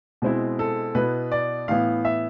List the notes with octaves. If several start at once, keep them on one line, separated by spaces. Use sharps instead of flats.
B2 G#3 C4 E4
A4
B2 B3 E4 B4
D5
A2 E3 B3 E4 F5
E5